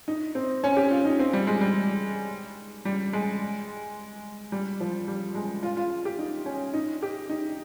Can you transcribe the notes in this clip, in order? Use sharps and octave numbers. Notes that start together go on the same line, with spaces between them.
D#4
C4
C#4
G4
F4
D#4
C4
G3
G#3
G3
G3
G#3
G3
F3
G3
G#3
F4
F4
G4
D#4
C#4
D#4
G4
D#4